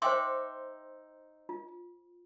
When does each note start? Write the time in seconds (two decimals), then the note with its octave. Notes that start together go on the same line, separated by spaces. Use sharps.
0.02 D#4 C5 E5 G5 C6 D6
1.49 F4